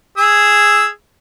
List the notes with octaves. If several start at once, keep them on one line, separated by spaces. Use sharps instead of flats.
G#4 E6